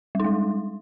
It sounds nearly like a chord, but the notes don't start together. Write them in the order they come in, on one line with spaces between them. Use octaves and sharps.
G3 D#4 G#3